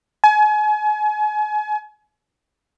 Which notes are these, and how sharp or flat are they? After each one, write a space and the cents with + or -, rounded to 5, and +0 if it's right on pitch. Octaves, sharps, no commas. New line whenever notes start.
G#5 +35